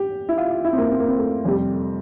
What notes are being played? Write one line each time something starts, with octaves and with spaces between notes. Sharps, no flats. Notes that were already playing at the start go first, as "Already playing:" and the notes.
Already playing: G4
E4
F4
F4
E4
C4
A#3
C4
A#3
C4
A3
F2 C3 G3